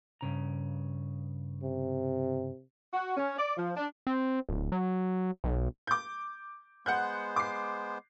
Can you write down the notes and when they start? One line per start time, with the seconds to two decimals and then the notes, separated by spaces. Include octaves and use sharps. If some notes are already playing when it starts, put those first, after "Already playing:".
0.21 G2 C#3 A#5
1.63 C3
2.93 F#4
3.17 C#4
3.38 D5
3.57 F3
3.76 D4
4.07 C4
4.49 D1
4.72 F#3
5.44 B1
5.87 D6 G6
6.86 G#3 B3 C5 F#5 F#6 G6
7.36 D6 C7